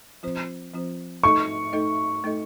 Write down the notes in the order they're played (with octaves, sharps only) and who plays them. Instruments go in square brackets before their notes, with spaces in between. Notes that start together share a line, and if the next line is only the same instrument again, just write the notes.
[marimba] F3 C4 F4 C5
F3 C4 F4 C5
[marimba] A3 D#4 A4 D#5 [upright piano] C#6
[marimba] A3 D#4 A4 D#5
A3 D#4 A4 D#5